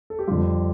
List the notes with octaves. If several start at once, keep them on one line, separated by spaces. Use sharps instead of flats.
A4
G4
F2 D3 G3 F4